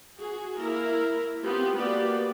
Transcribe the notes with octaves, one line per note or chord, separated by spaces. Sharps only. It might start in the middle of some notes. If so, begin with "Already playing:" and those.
F#4 G#4
A#3 E4 A#4
B3 C4 F4 G4
A#3 B3 F#4 G4 B4 D5